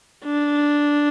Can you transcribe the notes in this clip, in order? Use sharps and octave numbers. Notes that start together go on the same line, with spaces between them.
D4